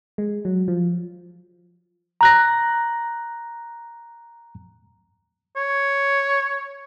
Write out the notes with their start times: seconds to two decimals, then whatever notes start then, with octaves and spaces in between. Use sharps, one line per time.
0.18 G#3
0.45 F#3
0.68 F3
2.21 A#5 F#6 A#6
5.56 C#5